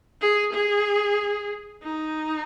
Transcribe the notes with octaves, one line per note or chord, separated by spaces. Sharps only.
G#4
G#4
D#4